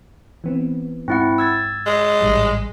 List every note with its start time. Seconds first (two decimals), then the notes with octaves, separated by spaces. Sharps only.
0.44 E3 B3 C4
1.08 G#2 C4 E4 F#5
1.38 E6 G#6 A6
1.86 G#3
2.21 A1 G#2 G3